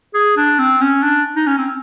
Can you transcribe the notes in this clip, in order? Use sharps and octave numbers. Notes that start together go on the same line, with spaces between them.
G#4
D4
C4
C#4
D4
D#4
C#4
C4